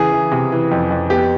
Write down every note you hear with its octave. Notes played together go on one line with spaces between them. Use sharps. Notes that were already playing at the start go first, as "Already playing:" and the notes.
Already playing: C#3 E3 G#4
E3
C3
E3
F2
F2
B3 G4